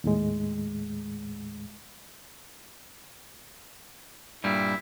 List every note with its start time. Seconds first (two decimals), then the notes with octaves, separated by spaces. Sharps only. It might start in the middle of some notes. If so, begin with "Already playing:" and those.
0.04 D#2 A2 G#3
4.44 G2 A#2 G3 E4